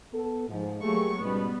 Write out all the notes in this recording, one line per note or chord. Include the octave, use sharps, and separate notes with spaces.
B3 A4
G#2 F3
F#3 A3 A#3 G4 G#4 C#6
G#2 B2 G3 B3 C#4